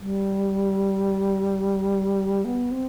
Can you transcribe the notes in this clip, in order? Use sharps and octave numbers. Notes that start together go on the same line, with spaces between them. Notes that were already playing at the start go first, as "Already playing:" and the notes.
G3
B3
C4